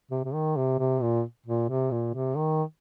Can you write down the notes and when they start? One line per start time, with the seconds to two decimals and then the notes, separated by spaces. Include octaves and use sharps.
0.11 C3
0.25 C3
0.34 D#3
0.57 C3
0.79 C3
1.02 A#2
1.46 A#2
1.69 C3
1.91 A#2
2.14 C3
2.36 D#3